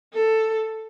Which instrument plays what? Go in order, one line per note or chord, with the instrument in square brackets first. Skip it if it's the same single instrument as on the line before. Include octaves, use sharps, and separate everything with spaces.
[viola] A4